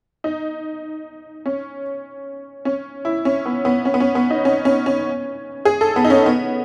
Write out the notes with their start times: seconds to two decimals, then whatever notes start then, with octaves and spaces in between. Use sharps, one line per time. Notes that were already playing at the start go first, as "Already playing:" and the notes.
0.24 D#4
1.46 C#4
2.65 C#4
3.05 E4
3.25 C#4
3.46 B3
3.65 B3
3.85 C#4
3.94 B3
4.00 C#4
4.15 B3
4.30 D#4
4.45 C#4
4.65 C#4
4.86 C#4
5.65 G#4
5.81 A4
5.96 B3
6.04 D#4
6.10 C#4
6.26 B3